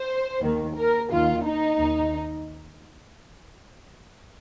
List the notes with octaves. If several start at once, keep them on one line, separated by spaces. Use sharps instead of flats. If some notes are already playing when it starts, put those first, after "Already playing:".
Already playing: C5
D#2 D#3
A#4
D#2 D#3 F4
D#4
D#2 D#3